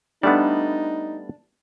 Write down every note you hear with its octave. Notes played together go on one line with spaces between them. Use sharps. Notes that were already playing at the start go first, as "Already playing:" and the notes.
G3 A3 B3 D4 D#4